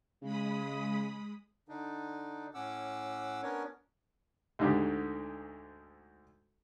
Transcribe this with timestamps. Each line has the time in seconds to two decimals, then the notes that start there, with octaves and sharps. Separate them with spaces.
0.22 C#3 G#3 B5 D#6
1.69 D3 D4 D#4
2.54 A2 C#4 F#5 D6 E6
3.43 B3 C#4 D4 A#4 C#5
4.59 D2 G#2 D3 G4